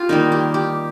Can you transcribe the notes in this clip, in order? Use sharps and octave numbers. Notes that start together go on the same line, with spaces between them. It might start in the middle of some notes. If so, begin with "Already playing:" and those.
Already playing: F4 G4
D#3 G3 A#3 D#4
G4
G4